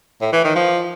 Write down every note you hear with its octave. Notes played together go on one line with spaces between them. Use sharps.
A2
E3
D#3
F3